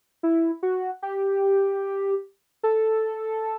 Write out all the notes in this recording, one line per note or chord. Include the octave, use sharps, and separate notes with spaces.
E4
F#4
G4
A4